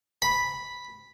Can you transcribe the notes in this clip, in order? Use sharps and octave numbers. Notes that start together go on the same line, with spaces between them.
B5